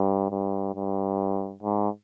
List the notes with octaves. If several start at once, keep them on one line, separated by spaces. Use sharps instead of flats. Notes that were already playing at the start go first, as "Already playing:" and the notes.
Already playing: G2
G2
G2
G#2